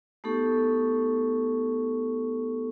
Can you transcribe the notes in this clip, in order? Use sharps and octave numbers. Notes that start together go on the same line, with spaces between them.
A3 B3 D#4 G4 A4 C#6